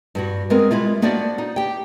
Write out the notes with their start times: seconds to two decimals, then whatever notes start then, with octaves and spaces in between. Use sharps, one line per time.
0.15 G2 G3 F#4
0.50 G#3 B3 C4 G#4 A#4
0.71 G3 G#3 E4 F4
1.02 A#3 B3 D4 F#4 C5 D5
1.38 D#4
1.56 G4 G5